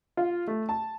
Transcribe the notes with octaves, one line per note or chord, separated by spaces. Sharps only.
F4
A3
A5